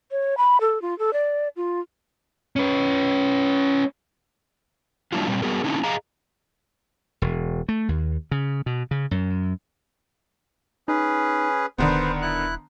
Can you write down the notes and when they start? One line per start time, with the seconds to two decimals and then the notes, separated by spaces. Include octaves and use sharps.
0.11 C#5
0.37 B5
0.61 A4
0.82 F4
0.99 A4
1.13 D5
1.56 F4
2.56 C#4 B4
5.13 F#3 G3 A#3 D4 E4 F4
5.27 A#2 G3 C4
5.42 G3 B3 F#4 G#4 A#4
5.64 D3 A#3 C#4 D#4 E4
5.84 G#4 D#5 F5 A#5
7.22 E1
7.69 A3
7.88 D#2
8.31 C#3
8.66 B2
8.91 C#3
9.11 F#2
10.88 C#4 D#4 G#4 B4
11.78 D#1 D3 D#3 B3 B4 C5
12.22 E4 F#6